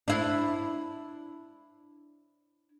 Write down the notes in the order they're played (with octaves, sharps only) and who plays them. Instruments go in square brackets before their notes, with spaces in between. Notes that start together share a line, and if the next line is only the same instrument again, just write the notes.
[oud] D4 E4